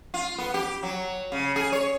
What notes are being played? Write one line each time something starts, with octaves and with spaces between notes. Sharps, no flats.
F4
B3
G4
F#3
C#3
G#4
C#5